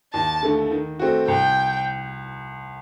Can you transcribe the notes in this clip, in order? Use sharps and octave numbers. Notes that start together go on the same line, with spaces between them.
D#2 A5
D3 A3
D#3
A3 C4 F#4
C2 G5